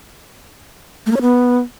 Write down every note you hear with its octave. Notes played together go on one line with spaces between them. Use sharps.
A3
A#3
C#5
B3